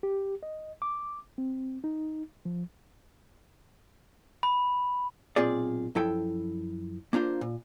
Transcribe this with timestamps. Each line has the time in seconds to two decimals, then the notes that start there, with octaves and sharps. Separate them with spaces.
0.03 G4
0.43 D#5
0.82 D6
1.38 C4
1.84 D#4
2.45 F3
4.43 B5
5.36 B1 A#2 C4 F4 G#4 D5
5.95 F#2 F3 E4 A4 G5
7.13 A#3 D4 F4 C5
7.41 A#2